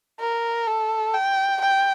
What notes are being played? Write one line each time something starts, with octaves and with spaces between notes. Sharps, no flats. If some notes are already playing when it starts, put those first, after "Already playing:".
A#4
A4
G5
G5